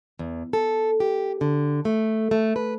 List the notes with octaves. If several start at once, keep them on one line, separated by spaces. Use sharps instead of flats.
E2
A4
G4
D3
A3
A3
B4